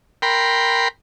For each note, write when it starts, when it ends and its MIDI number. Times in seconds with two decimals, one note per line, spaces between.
0.22 0.88 70
0.22 0.88 79
0.22 0.88 83
0.22 0.88 84